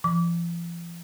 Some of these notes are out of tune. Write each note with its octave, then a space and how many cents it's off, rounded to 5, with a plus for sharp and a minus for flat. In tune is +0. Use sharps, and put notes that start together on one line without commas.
F3 -45 D6 -25